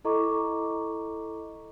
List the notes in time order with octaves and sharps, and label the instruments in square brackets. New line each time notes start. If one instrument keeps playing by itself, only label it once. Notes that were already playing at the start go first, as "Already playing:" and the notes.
[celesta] E4 A4 D#5 A#5 C#6 D6